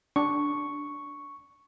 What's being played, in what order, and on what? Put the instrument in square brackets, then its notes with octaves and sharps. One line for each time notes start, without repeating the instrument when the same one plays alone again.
[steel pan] D4 [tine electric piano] C#6